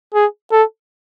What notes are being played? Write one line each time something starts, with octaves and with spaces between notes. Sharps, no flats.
G#4
A4